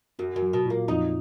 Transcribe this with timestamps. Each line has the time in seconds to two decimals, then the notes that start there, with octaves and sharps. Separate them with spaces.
0.19 F#2 F#4
0.36 F#2
0.42 F#3
0.53 B2
0.65 A#2
0.70 A#3
0.88 F2 D#4